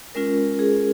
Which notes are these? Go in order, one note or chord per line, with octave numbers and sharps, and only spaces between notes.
G#3 C#4 F4 A#4
G#4